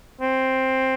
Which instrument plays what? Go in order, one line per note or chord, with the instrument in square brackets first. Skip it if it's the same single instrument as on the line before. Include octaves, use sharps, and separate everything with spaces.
[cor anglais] C4